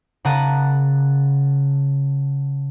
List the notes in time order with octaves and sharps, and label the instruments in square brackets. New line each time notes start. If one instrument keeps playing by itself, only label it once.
[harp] C#3 A#4 F#5 A5 D#7